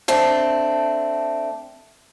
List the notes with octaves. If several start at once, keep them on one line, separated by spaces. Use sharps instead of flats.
A3 C4 D4